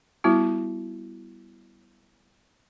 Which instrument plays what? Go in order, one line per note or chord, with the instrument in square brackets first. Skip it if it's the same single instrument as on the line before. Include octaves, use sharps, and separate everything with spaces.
[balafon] G3 B3 E4 F#4